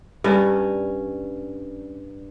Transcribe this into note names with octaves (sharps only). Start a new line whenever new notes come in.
G2 C#4